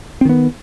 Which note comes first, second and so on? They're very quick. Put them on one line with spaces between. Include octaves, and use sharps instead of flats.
C4 D#3 B3